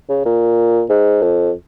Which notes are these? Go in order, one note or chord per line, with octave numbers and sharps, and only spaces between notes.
C#3
A#2
G#2
F2